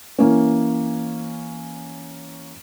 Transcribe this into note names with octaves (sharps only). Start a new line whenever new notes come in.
E3 A#3 C#4